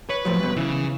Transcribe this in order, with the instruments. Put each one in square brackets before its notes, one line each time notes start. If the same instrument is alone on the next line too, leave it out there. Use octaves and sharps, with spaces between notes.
[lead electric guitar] B4 [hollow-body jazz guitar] C#5
[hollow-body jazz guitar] A2 F3 F#3
G2 B2
[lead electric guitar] C#3 [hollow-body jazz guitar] E3